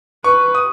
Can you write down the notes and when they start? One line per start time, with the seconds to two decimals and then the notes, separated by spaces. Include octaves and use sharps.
0.24 B4 C#6
0.55 D#6